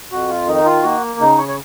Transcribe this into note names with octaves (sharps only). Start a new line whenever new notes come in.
F2 F#4
F4
D#3 D#4
F4
A#3 F#4
C#3 D#4
C#5
C#5